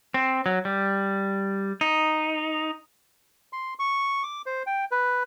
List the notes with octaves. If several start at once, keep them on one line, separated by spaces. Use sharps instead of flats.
C4
F#3
G3
D#4
C6
C#6
D6
C5
G5
B4